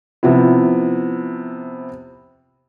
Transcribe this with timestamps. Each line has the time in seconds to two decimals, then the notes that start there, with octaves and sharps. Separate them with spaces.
0.23 C3 F3 B3 E4